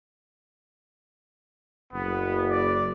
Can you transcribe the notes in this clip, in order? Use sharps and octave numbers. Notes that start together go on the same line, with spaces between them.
F#1 B3
D5